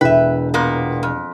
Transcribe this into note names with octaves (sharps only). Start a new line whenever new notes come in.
E1 B4 E5 G5
A#2 A#3 B3
F2